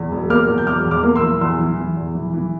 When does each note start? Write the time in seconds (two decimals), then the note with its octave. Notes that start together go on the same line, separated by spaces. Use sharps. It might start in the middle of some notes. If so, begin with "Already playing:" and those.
Already playing: E2
0.12 E1
0.30 A#3 D6 F6
0.48 E2
0.58 G6
0.66 E1 D6 F6
0.85 E2
0.91 D6 F6
1.03 A#3
1.16 C6 E6
1.22 E3
1.41 E2 C6 E6
1.59 E3
1.77 E3
1.96 E2
2.15 E3
2.33 E3